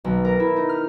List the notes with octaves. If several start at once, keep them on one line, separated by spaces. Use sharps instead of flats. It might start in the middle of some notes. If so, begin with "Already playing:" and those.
B1
A#4
E4
D#4
F6